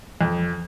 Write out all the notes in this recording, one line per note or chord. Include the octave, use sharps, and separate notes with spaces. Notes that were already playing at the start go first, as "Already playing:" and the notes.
F2